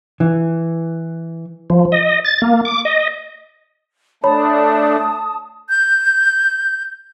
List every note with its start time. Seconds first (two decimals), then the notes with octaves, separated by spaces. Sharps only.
0.20 E3
1.70 F3
1.92 D#5
2.25 A6
2.42 A#3
2.65 D6
2.85 D#5
4.24 A3 D4 C#5 A5 B5 D#6
5.69 G6